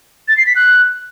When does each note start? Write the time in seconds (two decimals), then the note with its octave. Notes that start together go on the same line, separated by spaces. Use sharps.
0.28 A6
0.37 C7
0.46 B6
0.55 F#6